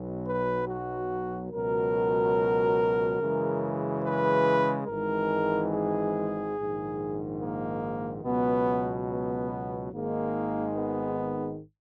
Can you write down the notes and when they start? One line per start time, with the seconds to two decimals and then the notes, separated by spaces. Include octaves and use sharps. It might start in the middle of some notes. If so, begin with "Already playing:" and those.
Already playing: B1 B2 F#3
0.26 B4
0.68 F#4
1.51 C#2 B2 F#3 A#4
3.19 F#2 C#3 E3 G#3
4.04 B4
4.88 G#1 G#2 E3 G#3 A#4
5.71 G#4
6.56 A#1 G#2 D#3
7.40 A#3
8.23 C#2 B2 F#3 B3
9.08 B3
9.92 G#1 G#2 D#3 G#3 A#3
10.75 B3